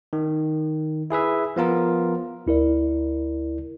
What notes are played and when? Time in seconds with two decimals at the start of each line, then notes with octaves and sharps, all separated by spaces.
0.13 D#3
1.10 E4 G#4 B4 E5
1.56 F3 B3 F4 A#4
2.46 D2 E4 A#4 D5